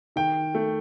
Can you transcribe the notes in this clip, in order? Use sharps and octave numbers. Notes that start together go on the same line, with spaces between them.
D#3 G5
A3